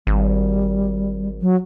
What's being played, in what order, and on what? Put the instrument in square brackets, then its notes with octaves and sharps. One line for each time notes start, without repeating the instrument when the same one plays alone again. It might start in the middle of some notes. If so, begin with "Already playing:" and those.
[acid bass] G#1 [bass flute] G3
[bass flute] F#3